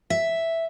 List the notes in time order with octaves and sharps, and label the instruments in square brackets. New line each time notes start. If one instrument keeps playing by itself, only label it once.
[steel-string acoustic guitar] E5